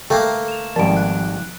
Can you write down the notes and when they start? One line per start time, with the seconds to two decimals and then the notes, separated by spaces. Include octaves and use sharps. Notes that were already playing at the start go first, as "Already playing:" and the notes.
0.10 D3 A3 A#3 A4 G5
0.48 E7 F7
0.76 G#1 F3 G3 A#4 A5 D7
0.97 F#6